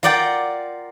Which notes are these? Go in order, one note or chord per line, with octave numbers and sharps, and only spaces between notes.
F4 A#4 D5 F#5 G5